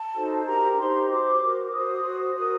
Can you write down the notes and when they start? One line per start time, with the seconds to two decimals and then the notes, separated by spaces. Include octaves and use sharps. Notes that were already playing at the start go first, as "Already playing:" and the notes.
Already playing: A5
0.14 D#4 F#4 A4 C5
0.45 D4 G4 A#4 A#5
0.77 D#4 G4 C5 C6
1.09 F#4 C5 D6
1.41 F#4 A#4
1.72 F#4 C5 D#6
2.04 F#4 C5
2.35 F#4 A#4 D#6